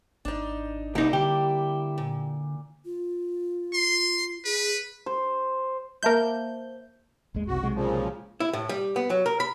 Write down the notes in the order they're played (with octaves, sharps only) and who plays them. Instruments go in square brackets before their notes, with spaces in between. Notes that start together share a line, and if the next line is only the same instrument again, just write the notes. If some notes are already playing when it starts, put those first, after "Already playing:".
[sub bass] G#1 [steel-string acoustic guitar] D4 D#4
[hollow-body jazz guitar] C2 D#4 [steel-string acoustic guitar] G3 A#3 E4
[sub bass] D3 [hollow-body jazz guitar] G4
[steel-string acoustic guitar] A#2
[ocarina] F4
[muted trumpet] C6
[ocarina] G#4 [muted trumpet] B4
[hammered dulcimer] C5
[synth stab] A#3 G6 [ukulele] C5 E5 A5
[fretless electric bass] G#1 D#2 G#3
[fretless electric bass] F#1 C2 C3 [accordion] F#4
[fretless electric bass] B1 C3 G#3
[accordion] A#2 C#3 F3
[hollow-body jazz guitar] E4
A2
G3
B3
F#3
A#4
B5